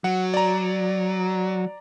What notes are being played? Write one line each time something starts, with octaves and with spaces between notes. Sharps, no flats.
F#3 F#5
D5 A#5